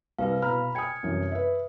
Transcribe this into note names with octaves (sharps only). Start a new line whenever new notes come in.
C2 E4 B4 F5
B2 A#5 B5 F6
G5 G#5 D#6 G#6 C#7
C2 F#2 E3
B4 E5